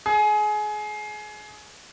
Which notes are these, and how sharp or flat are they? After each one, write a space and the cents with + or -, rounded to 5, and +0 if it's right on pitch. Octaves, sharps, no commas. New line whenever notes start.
G#4 +25